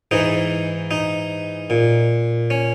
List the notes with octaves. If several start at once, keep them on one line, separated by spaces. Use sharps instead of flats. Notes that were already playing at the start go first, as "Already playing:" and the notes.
G#2 E3 D#4
D#4
A#2
C#4